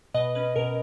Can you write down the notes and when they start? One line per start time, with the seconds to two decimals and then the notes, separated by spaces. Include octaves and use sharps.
0.14 B2 B4 D#5
0.35 C#4 B4
0.56 B2 A#4